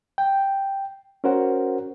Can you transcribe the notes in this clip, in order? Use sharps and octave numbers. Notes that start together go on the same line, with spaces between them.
G5
C#4 F#4 A#4 C5 F#5